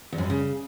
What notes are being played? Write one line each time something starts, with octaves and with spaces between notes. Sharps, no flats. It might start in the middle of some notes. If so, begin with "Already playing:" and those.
E2
F#2
G2
C#3